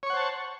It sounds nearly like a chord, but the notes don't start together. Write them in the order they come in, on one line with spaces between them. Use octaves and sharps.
C#5 C#6 F#5 C5 A5